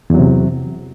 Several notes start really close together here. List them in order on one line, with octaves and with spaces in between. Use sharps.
E2 F#3 C3